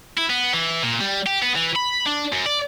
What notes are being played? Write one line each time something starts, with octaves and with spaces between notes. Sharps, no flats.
E4
B3
E3
A#2
G3
G4
B3
E3
B5
D4
F#2
D5